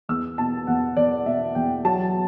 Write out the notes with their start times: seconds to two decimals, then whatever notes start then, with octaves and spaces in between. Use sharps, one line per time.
0.09 E2 E6
0.38 B2 A5
0.67 E2 F#5
0.97 E2 D5
1.26 B2 E5
1.55 E2 G5
1.85 F#3 A5